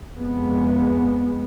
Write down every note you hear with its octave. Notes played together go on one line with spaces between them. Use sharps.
F2 G#3 B3